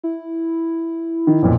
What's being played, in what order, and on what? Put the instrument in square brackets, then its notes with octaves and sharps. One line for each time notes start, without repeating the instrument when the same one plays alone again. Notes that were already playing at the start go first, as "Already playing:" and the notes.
[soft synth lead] E4
[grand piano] D#3
B1 F2 A#2